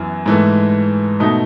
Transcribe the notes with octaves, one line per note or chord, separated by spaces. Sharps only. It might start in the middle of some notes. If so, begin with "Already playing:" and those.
Already playing: F#2 E3 B3
G#2 E3 A3
B2 A3 D#4